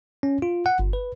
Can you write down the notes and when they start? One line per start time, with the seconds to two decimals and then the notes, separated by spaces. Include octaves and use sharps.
0.23 C#4
0.42 F4
0.66 F#5
0.79 G1
0.93 B4